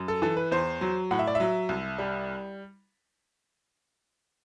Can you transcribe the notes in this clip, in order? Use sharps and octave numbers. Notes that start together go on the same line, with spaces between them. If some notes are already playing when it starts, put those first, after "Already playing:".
Already playing: F#2
A4
E3 A4
B4
E2 C5
F#3
A2 F#5
E5
D5
F#3 E5
C2
G3